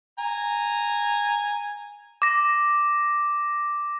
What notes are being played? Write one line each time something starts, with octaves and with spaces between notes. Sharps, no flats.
G#5 A#5
D6 A#6